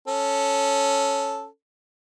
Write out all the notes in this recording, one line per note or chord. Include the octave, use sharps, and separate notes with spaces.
C#4 A4